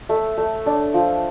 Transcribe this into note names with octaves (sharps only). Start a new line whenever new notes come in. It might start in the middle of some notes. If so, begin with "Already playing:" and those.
A3
A3
D4
F3